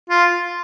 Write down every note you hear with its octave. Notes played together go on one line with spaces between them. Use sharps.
F4